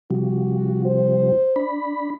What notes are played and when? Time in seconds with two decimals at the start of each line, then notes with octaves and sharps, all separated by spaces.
0.11 C3 F3 G3 F#4
0.85 C5
1.56 D4 B5